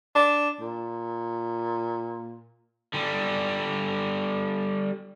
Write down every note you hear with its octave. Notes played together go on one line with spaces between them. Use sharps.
D4
A#2
D3 G3